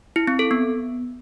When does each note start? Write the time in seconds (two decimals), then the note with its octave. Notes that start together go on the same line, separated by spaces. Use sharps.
0.16 E4
0.28 C4
0.39 A4
0.51 B3